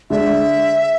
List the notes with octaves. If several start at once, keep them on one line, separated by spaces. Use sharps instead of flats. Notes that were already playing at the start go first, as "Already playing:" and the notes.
D3 G#3 D4 E5